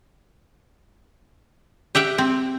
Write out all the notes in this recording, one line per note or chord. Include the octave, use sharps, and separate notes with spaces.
G4 E5 F#5 G5
C4